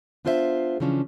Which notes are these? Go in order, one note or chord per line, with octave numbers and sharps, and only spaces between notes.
B3 D4 F4 C5 C#5 E5
C#3 E3 F3 C#4 D4